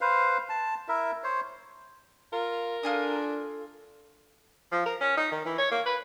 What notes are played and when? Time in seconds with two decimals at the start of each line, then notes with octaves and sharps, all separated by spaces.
0.01 B4 C5 F5
0.49 A5
0.88 E4 A#4 E5
1.24 C5 C#5
2.33 F4 A#4
2.83 D4 F4 A4 G#5 D#6
4.72 F3
4.86 A#4
5.01 C#4
5.17 D#4
5.32 D#3
5.45 E3
5.58 C#5
5.71 A#3
5.86 B4